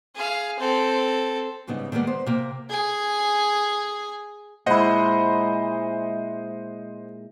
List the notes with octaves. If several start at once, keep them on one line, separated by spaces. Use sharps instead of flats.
G#4 F5
C4 A4
G#2 C#3 G3 B3 D#4
D#3 G3 G#3 A#3 B3
B3 C5
C3 A#3 C4
G#4 G#5
A#2 G#3 E4 C5 D#5 F#5